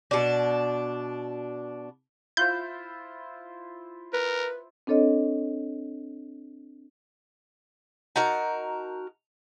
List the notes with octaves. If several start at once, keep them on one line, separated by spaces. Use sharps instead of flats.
B2 D4
E4 F4 C5 G6
A#4 B4
C4 D4 A4 C#5 D#5
D#4 F#4 A#4 A5